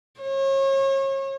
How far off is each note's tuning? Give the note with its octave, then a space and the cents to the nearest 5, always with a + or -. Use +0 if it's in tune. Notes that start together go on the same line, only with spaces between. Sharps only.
C#5 -35